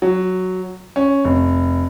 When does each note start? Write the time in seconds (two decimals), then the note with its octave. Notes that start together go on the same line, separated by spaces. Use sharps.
0.02 F#3
0.96 C#4
1.25 F1